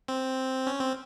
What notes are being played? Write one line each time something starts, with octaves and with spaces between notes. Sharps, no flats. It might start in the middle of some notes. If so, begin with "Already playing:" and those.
C4
C#4
C4